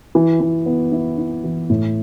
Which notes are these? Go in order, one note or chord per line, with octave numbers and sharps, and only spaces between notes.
E3
E3
B3
E4
E4
E3
A2